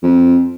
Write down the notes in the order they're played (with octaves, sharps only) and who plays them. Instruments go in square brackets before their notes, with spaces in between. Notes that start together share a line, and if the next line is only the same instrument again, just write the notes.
[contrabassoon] F2